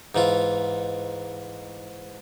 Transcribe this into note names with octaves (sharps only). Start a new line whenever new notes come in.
G#2 E3 F4